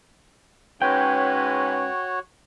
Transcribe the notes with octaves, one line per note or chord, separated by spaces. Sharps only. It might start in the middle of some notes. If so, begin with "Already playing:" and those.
G#2 C#4 F#4 B4 C#5 G5